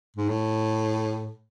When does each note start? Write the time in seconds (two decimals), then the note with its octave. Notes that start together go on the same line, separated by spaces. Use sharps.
0.17 G#2
0.29 A2